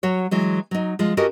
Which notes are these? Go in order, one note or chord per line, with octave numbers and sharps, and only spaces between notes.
F#3 F#4 C#5
E3 F#3 G#3
F#3 D#4
F3 G#3 F4
C#4 F#4 G4 A4 A#4 D#5